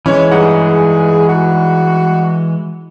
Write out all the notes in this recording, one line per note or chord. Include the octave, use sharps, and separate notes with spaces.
E3 G#3 C#4 C#5
G2 D#4 G#4 F#5
F#4